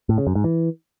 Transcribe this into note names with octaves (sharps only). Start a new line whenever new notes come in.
A2
C#3
F#2
G#2
E3